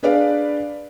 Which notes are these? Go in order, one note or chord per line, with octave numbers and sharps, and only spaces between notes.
D4 G#4 B4 D5 F5